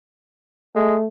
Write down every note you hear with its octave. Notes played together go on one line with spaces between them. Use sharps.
G#3 A3